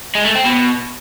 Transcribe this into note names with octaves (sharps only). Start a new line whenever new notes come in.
G#3
A3
C4
B2